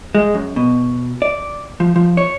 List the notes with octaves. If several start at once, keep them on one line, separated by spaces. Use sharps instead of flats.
G#3
F#2
B2
D5
F3
F3
C#5